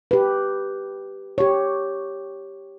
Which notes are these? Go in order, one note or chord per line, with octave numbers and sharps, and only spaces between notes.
G4 B4
G4 C#5